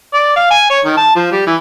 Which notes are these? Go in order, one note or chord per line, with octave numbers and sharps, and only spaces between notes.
D5
F5
G#5
C#5
D#3
A5
F3
G3
E3